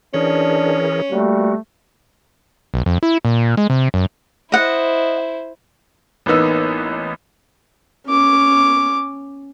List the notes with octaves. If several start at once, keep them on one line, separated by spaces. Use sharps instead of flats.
E3 C#4 D4 G#4 A#4
G3 A3 A#3 F#4
B1
F2
E4
A#2
G#3
C3
F#2
E4 C5 D#5 F#5
A1 A#3 B3 D#4 E6
C#4 D6